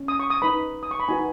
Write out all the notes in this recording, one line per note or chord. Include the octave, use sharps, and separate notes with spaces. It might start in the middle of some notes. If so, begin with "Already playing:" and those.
Already playing: C#4
D#6
C#6
D#6
D#4 B4 B5
D#6
C#6
B5
D#4 F#4 B4 G#5